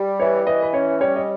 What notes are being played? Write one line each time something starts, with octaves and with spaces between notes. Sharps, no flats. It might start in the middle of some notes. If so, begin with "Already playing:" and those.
Already playing: G3
E3 C#5
E3 D#5
B4
C#4 C#5
G3 C#5
D#5